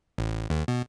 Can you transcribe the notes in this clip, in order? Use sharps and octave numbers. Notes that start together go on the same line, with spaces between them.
A1
D#2
B2